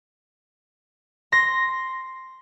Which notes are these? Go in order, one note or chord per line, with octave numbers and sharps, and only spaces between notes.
C6 A#6